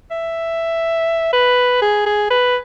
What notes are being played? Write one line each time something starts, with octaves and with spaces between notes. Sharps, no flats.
E5
B4
G#4
G#4
B4